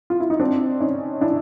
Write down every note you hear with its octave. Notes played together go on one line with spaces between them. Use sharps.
F4
E4
D#4
C4 D4
C#4 D#4
D4 E4